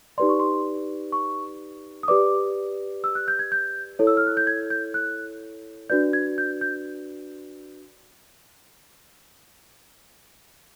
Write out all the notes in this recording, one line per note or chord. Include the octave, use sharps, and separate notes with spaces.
D#4 G4 B4 D5 C6
C#6
C6
C#6
D#6
G4 B4 D5 D6
E6
F#6
G6
G#6
G6
E4 A4 C#5
E6
F6
F#6
G6
G#6
G6
F#6
D4 F#4 B4 D5 G6
G#6
G6
G6